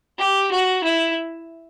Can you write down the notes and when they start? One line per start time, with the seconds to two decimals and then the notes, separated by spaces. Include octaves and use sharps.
0.18 G4
0.51 F#4
0.83 E4